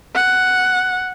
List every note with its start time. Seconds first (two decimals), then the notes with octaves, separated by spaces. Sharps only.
0.15 F#5